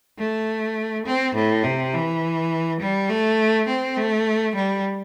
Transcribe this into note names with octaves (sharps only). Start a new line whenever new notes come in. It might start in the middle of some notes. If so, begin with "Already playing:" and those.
A3
C4
A2
C3
E3
G3
A3
C4
A3
G3